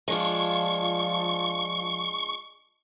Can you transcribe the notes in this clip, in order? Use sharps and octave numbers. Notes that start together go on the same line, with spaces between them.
F3 G#3 D4 F4 C#6